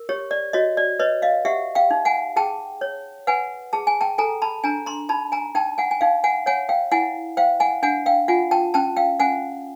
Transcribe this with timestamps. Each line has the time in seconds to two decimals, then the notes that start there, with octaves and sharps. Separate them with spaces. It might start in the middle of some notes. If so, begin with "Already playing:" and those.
Already playing: A#4
0.09 G4 C#5
0.31 D5
0.53 F#4 C#5 D#5
0.77 D5
0.99 B4 C#5 D#5
1.22 D#5 F5
1.45 G4 E5 F#5
1.75 F5 G5
1.91 D#4
2.05 F#5 G#5
2.36 G#4 G5 A5
2.81 C#5
3.27 B4 F#5 G#5
3.73 G#4 A5
3.87 G#5
4.01 G5 A5
4.18 A4 G#5 A#5
4.42 A5 B5
4.64 D4 G#5 A#5
4.86 A#5 C6
5.09 D#4 A5 B5
5.32 G#5 A#5
5.55 D#4 G5 A5
5.78 F#5 G#5
5.91 G#5
6.01 D#4 F5 G5
6.24 F#5 G#5
6.46 C#5 F#5 G#5
6.69 F5 G5
6.92 E4 F#5 G#5
7.37 C5 F5 G5
7.60 F#5 G#5
7.83 D4 F#5 G#5
8.06 F5 G5
8.28 F4 F#5 G#5
8.51 G5 A5
8.74 C#4 G5 A5
8.97 F5 G5
9.20 C#4 F#5 G#5